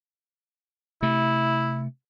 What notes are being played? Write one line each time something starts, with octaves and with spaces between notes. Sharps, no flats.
C3 A3 E4